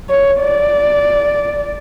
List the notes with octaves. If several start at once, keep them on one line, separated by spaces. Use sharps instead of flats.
C#5
D5